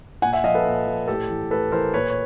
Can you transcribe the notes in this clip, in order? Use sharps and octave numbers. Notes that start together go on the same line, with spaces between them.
A#2 F#5 G#5
E5 F#5
F3 D#5 F5
A4 B4
A#2
F3
A2 G4 A4
E3
A2 A4 B4
E3 A#4 C5
A#2 B4 C#5
C#5